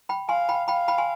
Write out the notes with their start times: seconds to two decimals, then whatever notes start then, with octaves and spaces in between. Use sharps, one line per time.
0.09 G5 B5
0.29 F5 G#5 C6
0.49 G5 B5
0.68 F5 G5 B5
0.88 G5 B5
0.98 G#5 C6